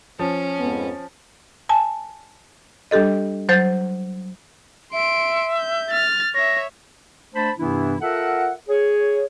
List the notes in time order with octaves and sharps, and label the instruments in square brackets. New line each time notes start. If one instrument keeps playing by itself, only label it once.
[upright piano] F3 [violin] C#4
[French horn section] F2 G#2 B3
[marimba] G#5 A5
G3 D4 G4 A4 D#5
F#3 C5 G6 A6
[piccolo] E5 [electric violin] C6 D7
[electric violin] G6
F6 A6
[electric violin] C#5 E5 [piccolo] A#6
[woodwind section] A3 D4 C5 A5 B5
G2 C3 E3 B3 D4 E4
F4 A4 A#4 E5 F#5
G#4 C#5